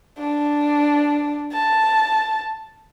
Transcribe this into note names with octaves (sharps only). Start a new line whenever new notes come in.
D4
A5